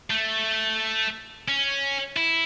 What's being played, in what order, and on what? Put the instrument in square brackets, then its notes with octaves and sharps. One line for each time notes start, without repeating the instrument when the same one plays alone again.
[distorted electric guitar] A3
C#4
E4